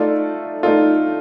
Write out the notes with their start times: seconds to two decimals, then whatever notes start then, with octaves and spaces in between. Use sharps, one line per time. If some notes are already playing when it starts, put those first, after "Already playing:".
Already playing: A3 D#4 F4 A4 D5
0.63 A3 D#4 F4 A4 D5